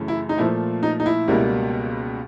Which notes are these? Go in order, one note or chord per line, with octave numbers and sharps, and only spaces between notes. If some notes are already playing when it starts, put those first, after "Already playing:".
Already playing: F#2 C#3 E3 A3
E4
D#4
A#2 F3 A3 E4
D#4
D#4
E4
C#2 B2 G3 A#3